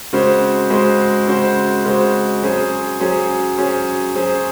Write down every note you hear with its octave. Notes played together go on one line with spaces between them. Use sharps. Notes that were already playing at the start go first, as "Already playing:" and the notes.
C#3 G#3 C4 F#4 C5
C#3 G#3 C4 F#4 C5
C#3 G#3 C4 F#4 C5
C#3 G#3 C4 F#4 C5
F#3 C#4 G#4 C5
F#3 C#4 G#4 C5
F#3 C#4 G#4 C5
F#3 C#4 G#4 C5